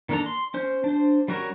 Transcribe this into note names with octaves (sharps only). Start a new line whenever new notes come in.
D#3 A#3 D4 A4 A#5
C6
C#4 C5
D4 C5
G3 C#4 F#4 A#4 C#5